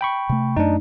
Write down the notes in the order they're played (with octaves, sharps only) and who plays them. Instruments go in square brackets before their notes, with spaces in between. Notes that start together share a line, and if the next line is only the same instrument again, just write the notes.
[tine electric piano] G5 B5 C#6
[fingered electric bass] C3 A3
[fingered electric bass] F#2 A3 [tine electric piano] D4 D#4